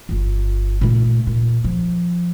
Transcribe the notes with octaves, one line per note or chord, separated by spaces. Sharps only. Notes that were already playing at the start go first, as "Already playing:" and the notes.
G1 F4
A#2 A3
A#2
F3